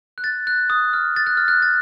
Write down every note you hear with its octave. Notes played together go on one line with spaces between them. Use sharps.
F#6
A6
F#6
D#6
F6
A6
F#6
F6
F#6
A6